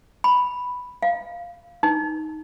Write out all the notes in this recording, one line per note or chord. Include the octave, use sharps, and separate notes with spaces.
B5
F5
D#4